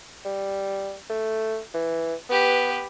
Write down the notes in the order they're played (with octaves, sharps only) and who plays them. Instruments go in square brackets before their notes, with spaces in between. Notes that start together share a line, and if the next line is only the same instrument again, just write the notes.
[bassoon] G3
A3
E3
[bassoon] B3 [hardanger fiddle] G4 B4